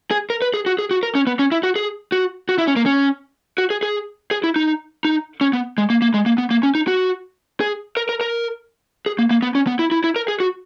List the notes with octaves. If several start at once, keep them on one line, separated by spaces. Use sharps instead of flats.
G#4
A#4
B4
G#4
F#4
G#4
F#4
A#4
C#4
B3
C#4
E4
F#4
G#4
F#4
F#4
E4
C#4
A#3
C#4
F#4
G#4
G#4
G#4
E4
D#4
D#4
C#4
B3
G#3
A#3
A#3
G#3
A#3
B3
A#3
C#4
D#4
F#4
G#4
A#4
A#4
A#4
G#4
A#3
A#3
B3
C#4
B3
E4
E4
E4
A#4
G#4
F#4